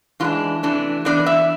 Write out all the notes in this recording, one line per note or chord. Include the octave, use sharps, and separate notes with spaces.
E3 G#3 D4 F4
C3 E3 A3 D4
E3 B3 D4 D5
E5